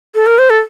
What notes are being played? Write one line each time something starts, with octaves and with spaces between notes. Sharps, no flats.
A4
A#4
C5
A4